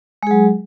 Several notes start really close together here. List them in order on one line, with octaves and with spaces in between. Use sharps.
G#3 G#4 F#3